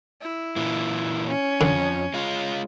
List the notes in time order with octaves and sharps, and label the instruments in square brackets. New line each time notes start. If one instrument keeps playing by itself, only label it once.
[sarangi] E4
[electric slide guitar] A#2 E3 A#3
[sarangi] C#4
[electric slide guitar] F2 [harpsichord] D3
[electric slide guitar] G#3 F4